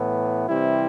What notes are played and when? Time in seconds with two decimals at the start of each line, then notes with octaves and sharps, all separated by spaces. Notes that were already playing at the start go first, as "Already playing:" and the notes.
Already playing: A2 E3 B3
0.48 C3 E3 G3 C4 E4